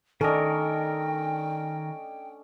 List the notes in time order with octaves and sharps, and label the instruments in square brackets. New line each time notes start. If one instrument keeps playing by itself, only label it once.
[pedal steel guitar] D#3 A#4 [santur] C#4 D4 D#5 [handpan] A4 [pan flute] G5